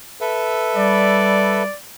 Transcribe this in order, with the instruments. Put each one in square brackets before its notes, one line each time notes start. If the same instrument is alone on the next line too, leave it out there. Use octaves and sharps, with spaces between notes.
[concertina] A4 B4 E5
[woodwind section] G3 [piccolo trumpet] D5